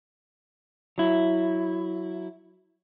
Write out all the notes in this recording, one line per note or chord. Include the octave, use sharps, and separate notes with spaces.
F#3 E4